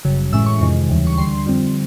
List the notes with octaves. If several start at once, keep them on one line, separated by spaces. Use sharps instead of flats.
G1 F#2 C#3
A2 E3 G#3 C#4 E6
C#6
F2 C3 D#3 G#3
D#2 C#3 E3 G3
C#6
D2 D3 G3 C6
F2 D3 G3 C4